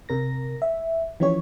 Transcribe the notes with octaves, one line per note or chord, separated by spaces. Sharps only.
C3 A#4 A#6
E5
E3 F3 C#4 G4 C#5